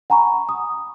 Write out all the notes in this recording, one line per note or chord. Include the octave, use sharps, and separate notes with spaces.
F#5 G#5 A#5 B5 C#6
D#6